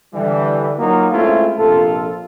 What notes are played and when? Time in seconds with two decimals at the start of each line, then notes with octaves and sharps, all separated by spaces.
0.14 D3 E3 G3
0.78 F#3 A#3 D#4 F4 F#4
1.11 G#3 A3 C4 C#4 E4 F4
1.57 A#1 C3 F4 A4